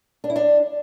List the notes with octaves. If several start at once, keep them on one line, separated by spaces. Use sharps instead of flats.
D4
E4
D4